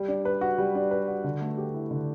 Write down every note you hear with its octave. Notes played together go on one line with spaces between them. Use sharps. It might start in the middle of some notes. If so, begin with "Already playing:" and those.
Already playing: G3
D4
B4
F#4
G3
D4
B4
F#4
D3
A3
G4
E4
D3